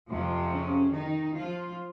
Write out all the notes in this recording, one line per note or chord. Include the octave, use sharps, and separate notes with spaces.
F2 C3 F3
C#3 C#4
D#3 D#4
F3 F4